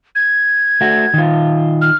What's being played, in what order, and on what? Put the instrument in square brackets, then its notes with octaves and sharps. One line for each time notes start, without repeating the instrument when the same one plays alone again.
[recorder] G#6
[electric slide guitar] A3 F#4
D#3 F4
[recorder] F6